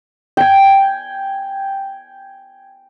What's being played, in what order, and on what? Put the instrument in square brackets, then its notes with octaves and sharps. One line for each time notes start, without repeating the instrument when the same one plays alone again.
[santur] G5 G#5